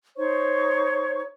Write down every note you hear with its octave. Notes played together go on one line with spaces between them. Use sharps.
D#4 C5 C#5 C#6